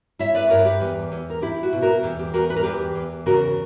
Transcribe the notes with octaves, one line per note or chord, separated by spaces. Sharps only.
E4 C#5 E5
B4 D5
G2 A#4 C#5
G4 B4
E2
E2
A#4
E4 G4
F#4
B2
F#4 A#4
E2 G4
G4
E2 F#4 A#4
B4
A#4
E2 G4 B4
E2
C#3 F#4 A#4